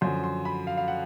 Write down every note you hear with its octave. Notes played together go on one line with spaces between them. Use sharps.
F#2 D3 F3 C6
C6
B5
F5
F5
F#5